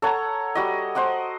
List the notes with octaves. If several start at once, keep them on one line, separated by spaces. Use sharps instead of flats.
A4 C#5 F#5 A#5
G3 F#4 D#5
C5 D#5 F#5 D6